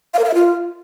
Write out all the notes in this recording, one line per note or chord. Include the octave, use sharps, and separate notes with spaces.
F5
A#4
F5
E5
F4